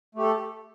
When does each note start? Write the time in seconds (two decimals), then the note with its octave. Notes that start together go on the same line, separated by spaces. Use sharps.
0.15 A3
0.18 G4
0.22 A4